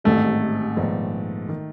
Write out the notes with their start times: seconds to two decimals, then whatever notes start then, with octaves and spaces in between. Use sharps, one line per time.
0.04 A1 G#2 D#3 G3 A3 C4
0.77 A#1 G#2 D#3 G#3 B3
1.49 D#3